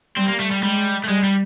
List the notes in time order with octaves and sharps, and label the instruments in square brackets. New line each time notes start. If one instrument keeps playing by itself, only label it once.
[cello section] G3 [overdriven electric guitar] C4
[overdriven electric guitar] A#3
A3
G3
[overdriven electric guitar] G3 [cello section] G#3
[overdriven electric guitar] A3
[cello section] G3 [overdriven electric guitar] G#3
[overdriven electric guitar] G3